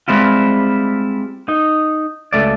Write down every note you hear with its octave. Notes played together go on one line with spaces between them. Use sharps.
G3 G#3 C4 E4 F4
D#4
C#2 A3 D5